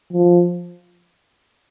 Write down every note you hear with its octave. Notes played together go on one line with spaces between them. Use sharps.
F3